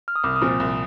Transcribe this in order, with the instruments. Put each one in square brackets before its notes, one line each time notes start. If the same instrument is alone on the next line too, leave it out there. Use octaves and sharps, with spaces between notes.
[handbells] F6
D#6
[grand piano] C2 [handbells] D6
[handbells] D#6
[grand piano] A#2 F3 C4
[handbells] D#6
[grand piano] C2